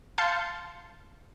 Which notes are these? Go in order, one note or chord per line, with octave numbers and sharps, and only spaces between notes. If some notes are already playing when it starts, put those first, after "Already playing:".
F5 A5 C6 G6 A6 C#7